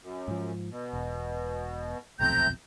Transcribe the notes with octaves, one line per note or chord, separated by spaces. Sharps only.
F#2
G#2 F3
B2
E1
D#1 B1 F2 A3 C4 A#5 G6